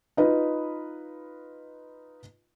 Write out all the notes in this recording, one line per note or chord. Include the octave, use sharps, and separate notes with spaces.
D#4 F4 B4 D#5